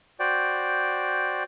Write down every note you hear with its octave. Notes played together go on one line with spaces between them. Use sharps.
F#4 C5 D5 G5